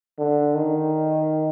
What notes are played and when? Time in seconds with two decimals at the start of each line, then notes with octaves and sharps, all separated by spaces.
0.19 D3
0.55 D#3